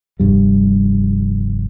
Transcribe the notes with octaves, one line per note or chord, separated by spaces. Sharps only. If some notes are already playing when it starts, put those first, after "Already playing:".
F1 G2 G3